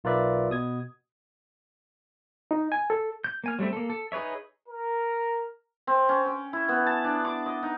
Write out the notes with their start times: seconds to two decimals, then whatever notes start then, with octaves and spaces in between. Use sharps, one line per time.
0.04 B1 F4 A#4 B4 D5 E5
0.50 B2 D#6 G#6
2.51 D#4
2.72 G#5
2.90 A4
3.24 G6
3.44 A#3 G#5 F6
3.59 F#3 G3 A3 C4 E5
3.73 A#3 A4
3.90 A4
4.12 D#4 G#4 B4 C#5 E5
4.68 A#4
5.87 C4
6.09 C#4
6.26 G5
6.53 E4
6.69 B3
6.86 A5
7.04 D4
7.25 D6
7.46 D#5
7.63 D#4